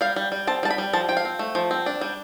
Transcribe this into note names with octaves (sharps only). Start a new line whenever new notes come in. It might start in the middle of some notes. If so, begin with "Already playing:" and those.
G3 F5
G3
G3
C4 A5
G3 A5
B5
G3
F3 A5
F3 G5
F5
C4
A3
F3
C4
D4
G3